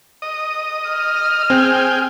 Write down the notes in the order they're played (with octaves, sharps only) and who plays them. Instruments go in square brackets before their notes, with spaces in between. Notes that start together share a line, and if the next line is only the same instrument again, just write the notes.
[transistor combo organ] D#5
[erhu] F6
[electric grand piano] C4 [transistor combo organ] G#4 G5